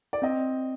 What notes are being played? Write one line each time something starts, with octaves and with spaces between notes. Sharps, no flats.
D5
C4 D#5